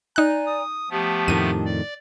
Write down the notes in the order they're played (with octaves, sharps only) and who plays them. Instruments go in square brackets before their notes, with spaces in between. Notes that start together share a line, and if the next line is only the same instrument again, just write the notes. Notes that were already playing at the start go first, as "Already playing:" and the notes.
[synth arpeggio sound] D#4 F#6 [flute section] D5 G#5 A#5
[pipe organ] D#6
[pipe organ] F3 A3 B3 [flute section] G4 A5 D#6
[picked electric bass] F2 A2 D#3 [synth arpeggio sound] D#7
[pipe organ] D5